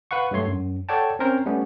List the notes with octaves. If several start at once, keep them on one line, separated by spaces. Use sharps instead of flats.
B4 F5 F#5 C#6
G2 F#3 A3 C#5 C6
F#2
A4 C#5 D5 F#5 G5 A5
C4 C#4 A#4 C5 C#5
G3 A3 B3 C#4